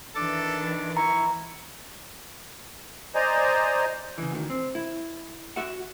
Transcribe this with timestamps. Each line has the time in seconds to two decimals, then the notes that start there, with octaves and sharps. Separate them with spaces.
0.15 D#3 E3 D4 A4 D6
0.97 E4 A#5 C#6
3.15 C5 D5 D#5 G#5 A#5
4.18 C#3 E3
4.31 D2 D#3
4.50 C4
4.75 E4
5.56 F#4 E5 F#5